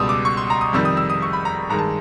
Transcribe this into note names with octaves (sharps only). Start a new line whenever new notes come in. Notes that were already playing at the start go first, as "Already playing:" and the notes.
Already playing: C#2 B2 G3 D#6 E6
D6
C#6
C6
A#5
D#6
F2 C3 D#3 G3 E6
D#6
E6
D#6
C#6
B5
A#5
G2 D#3 G#3 A#5
A5